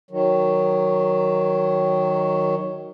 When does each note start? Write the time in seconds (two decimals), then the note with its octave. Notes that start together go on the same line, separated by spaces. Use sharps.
0.11 D#3 F#3